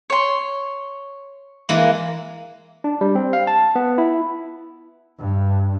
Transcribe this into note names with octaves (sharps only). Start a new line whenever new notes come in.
C#5 C6
E3 G#3 A#3
D4
G3
C4
F5
A5
B3
E4
G2